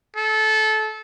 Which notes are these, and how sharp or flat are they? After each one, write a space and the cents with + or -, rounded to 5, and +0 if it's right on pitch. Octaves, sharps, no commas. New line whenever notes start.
A4 -20